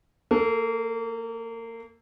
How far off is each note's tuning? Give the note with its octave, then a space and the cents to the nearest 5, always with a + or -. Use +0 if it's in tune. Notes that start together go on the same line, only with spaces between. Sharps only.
A#3 -30 A4 +0